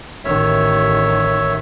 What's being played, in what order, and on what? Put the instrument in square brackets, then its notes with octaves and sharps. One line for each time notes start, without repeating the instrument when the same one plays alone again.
[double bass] A1 D#3 [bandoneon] C#5 E5